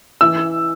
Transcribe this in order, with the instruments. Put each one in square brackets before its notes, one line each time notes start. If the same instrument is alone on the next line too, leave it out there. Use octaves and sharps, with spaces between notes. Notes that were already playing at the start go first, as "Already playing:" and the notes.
[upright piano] E3 E6